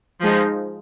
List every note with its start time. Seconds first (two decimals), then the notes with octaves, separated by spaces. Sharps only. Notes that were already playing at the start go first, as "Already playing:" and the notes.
0.20 F3 G#3 D#4